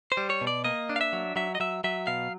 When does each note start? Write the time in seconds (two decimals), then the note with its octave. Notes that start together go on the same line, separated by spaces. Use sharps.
0.12 C5
0.17 G3
0.30 C#5
0.41 B2
0.47 D5
0.64 A#3 D#5
0.89 D4
0.96 F5
1.01 E5
1.13 F#3
1.36 F#3 E5
1.55 D#5
1.60 F#3 E5
1.84 F#3 E5
2.07 B2 F5